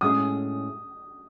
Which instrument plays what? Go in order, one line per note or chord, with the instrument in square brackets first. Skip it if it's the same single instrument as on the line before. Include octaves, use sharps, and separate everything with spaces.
[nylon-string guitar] A2 G#3 C#4 G#4 [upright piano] D#6